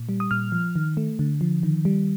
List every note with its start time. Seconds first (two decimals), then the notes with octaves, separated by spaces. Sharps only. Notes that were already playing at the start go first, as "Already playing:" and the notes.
Already playing: A#2
0.09 G3
0.20 D#6
0.31 A#2 F6
0.52 F3
0.76 D#3
0.97 A3
1.19 D3
1.41 F3
1.63 D#3
1.85 G3